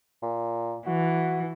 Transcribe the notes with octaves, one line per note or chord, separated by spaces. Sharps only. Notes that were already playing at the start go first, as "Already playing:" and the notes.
A#2
E3 F#4